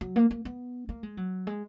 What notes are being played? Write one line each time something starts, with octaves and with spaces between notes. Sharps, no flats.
F#3
A#3
A#3
B3
A#3
G#3
F#3
G#3